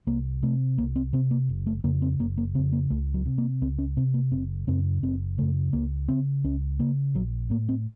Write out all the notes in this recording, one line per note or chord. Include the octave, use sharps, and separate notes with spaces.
C2 A#3
C3 A3
C2 A#3
C4
C3 C4
A#3
F#1
A3
F2 C#3 A#3
C4
F#1 A#3
A#3
F2 C#3 C4
A#3
C#2 A3
F#3
C3
A#3
C#2 C4
C#4
C3 C4
A#3
F#1 C4
F#2 C#3 C4
F#1 C4
F#2 C#3 A3
C#2 A#3
C#3 C4
C#2 C#4
C#3 A#3
A#1 F#3
A2 A#3
C4